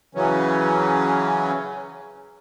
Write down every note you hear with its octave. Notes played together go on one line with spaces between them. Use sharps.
C#3 E3 F#3 C#4